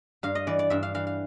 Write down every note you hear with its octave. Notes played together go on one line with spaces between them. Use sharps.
G2 F5
D#5
E3 D5
D5
G2 E5
F5
E3 F5
F5